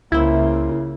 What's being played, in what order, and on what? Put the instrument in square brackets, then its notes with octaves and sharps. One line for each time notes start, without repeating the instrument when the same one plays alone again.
[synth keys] C#2 C5 [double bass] C#3 A#3 [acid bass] E4